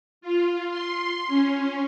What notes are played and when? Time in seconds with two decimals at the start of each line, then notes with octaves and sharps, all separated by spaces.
0.21 F4
0.69 C6
1.27 C#4